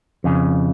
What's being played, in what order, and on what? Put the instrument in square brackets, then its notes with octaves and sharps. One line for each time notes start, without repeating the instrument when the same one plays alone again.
[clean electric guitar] F2 C#3